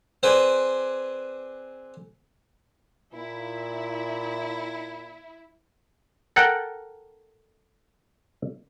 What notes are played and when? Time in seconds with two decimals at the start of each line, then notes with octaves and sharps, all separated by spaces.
0.23 C4 G#4 B4 C5 D5 G#5
3.14 A#2 E4
6.36 A4 A#4 F#5 G5